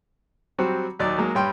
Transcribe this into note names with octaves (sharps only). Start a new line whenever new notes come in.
F#3 G3 C4 F#4
D#2 F#3 D#4 D5 D6
F#3 G#3 A#3
G2 G3 C#5 G5 B5 C6